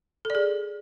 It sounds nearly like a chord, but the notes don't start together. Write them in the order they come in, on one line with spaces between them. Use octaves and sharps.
A4 D5 G#4